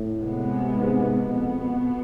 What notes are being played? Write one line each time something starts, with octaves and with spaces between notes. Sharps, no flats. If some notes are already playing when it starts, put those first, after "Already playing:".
Already playing: A2
C3 G#3 B3
G#2
F2 B2 B3